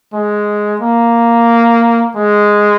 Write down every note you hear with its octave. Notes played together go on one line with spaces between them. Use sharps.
G#3
A#3
G#3